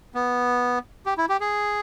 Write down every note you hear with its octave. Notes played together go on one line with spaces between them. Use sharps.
B3
G4
E4
G4
G#4